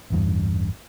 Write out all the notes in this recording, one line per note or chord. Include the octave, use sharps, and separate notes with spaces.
A1 E2 G2